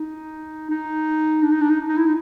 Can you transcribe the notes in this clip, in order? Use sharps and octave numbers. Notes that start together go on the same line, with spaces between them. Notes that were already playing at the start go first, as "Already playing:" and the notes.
Already playing: D#4
D#4
D4
D#4
D4
D#4
D#4
E4
D#4